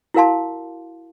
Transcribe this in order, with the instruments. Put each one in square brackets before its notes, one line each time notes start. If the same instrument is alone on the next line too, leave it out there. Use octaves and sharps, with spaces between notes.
[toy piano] E4 F#4 A#4 F5 A5 C6